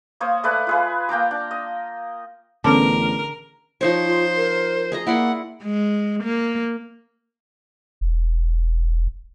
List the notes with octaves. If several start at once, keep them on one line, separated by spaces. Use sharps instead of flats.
A#3 C5 C#5 D#6
A3 B4 D5 F#5
F4 G#4 B4
A#3 G5 A#5 D6
D4
D#5
A1 D3 B3 C#4 G#4 A#4
F3 D#4 C5 C#5
F4
A#4
G#4 D#5 A#5
A#3 E4 D5 F#5 C6
G#3
A#3
E1